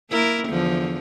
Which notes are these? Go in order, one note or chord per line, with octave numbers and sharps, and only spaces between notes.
A#3 E4 A#4
E2 D3 F3